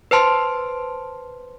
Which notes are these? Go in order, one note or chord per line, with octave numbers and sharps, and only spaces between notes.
B4 C5 A5 C6